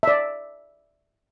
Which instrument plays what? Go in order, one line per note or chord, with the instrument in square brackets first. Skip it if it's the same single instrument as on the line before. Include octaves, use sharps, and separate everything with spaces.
[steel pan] D5 E5